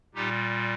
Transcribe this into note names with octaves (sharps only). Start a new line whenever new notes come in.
A#2 G3 D#4 G4